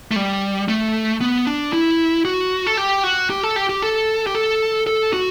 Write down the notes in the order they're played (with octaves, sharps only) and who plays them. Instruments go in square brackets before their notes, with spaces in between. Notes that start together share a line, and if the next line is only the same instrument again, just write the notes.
[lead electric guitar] A3
G3
A3
B3
D4
E4
F#4
A4
G4
F#4
G4
A4
G4
G4
A4
G4
A4
A4
F#4